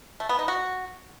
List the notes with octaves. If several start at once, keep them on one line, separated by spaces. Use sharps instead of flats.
A3
B3
D#4
F#4